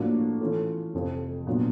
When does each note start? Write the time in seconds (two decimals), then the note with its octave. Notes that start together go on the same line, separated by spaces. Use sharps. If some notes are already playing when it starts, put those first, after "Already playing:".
Already playing: A2 F3 A#3 D4 F#4
0.41 E3 A3 C#4 F4 A4
0.94 F1 F2 C3 F3
1.47 A#2 F#3 B3 D4 F4